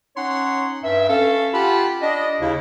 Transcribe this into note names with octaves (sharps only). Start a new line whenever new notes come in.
C#4 D#4 C#5 F#5 C6
G2 E5
C#4 A4 F5
F4 G4 F#5 A5 B5
D4 D#5
D#2 C#3 E4